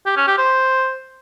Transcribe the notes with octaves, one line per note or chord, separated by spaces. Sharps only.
G4
C#4
G4
C5